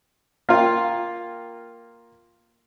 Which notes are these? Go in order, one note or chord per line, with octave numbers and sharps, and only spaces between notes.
A#3 F4 G5